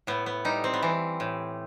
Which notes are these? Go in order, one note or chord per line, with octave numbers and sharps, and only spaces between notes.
A2 B3
B3
G3 D#4
C4
B3
E3 C4
A2